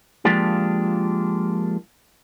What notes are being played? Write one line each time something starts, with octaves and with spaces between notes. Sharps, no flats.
F3 G#3 A#3 D4 F4 G4